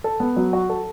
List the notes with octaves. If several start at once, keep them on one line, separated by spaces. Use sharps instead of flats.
A4
B3
F#3
F#4
A4